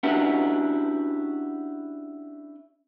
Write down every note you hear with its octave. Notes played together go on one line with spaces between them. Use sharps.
C#4 D4 E4 F#4 G4 B4